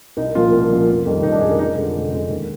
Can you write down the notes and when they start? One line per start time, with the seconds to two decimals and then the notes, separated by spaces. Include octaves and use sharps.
0.17 C2 D#4
0.35 A#2 F3 F4
0.52 C2
0.70 A#2 F3
0.88 F1
1.05 F2 D#3 G3
1.23 F1 D#4
1.32 D4
1.41 F2 D#3 G3 G#4
1.51 A#4
1.58 F1 D#4
1.77 F2 D3 G#3
1.95 F1
2.12 F2 D3 G#3
2.29 D#2